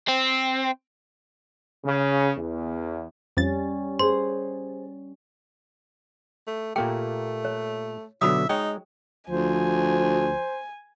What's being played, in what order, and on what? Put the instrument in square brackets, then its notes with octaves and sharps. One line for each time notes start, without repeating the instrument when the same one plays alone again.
[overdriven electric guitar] C4
[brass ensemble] C#3
E2
[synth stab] F2 A6 [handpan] G3 C#4
[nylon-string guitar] G#4 C5 [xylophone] C6
[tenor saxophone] A3
[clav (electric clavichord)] A#2 A#3 G4 [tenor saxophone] A3 [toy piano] G5
[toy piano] C#5
[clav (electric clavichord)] B2 D3 F#3 [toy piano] F#4 B5 D#6 [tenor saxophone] E5
[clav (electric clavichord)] G#3 C#5 [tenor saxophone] D#4 [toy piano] G5
[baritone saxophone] D2 [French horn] F3 [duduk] C5 [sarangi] G#5